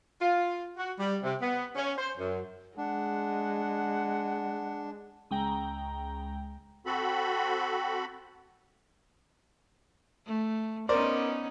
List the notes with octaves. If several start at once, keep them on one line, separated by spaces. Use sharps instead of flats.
F4
F#4
G3
C3
B3
C#4
C5
F#2
G#3 D4 F#5
C#2 G#3 G5 A#5
C4 F#4 A4 B5
A3
B3 C#4 D#4 A#4 C5 D5